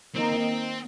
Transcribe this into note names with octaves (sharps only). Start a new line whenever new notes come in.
D#3 A#3 C4 D#4